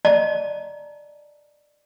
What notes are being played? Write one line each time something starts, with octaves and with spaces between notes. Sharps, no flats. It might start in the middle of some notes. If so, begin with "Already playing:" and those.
D5 D#5 A5 A#5